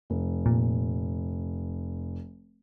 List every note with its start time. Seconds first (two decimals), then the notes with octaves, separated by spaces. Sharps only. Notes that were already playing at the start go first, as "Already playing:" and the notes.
0.10 F1
0.46 A#2